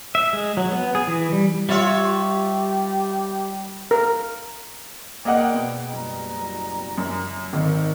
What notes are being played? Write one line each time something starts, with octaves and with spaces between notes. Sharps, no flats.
E5
G#3
F#3
B3
G#4
E3
G3
G3 F4 G4 C#5 E5
A#4
A#3 G#4 D5 D#5 F#5 G5
B2
F#1 G3 A#5
F#2
G#1 D#3